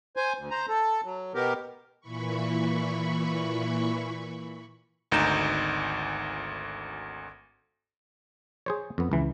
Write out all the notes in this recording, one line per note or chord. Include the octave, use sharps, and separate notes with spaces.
C5 G#5
D2
C5 A#5
A4
F#3
B2 B3 G4 A#4
A#2 E3 B5 C#6
G#1 D2 D#4 A#5 G6 E7
G#4 C5 C#5
F2 B3
C#2 E3